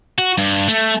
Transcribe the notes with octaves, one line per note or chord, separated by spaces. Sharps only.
F#4
G2
A3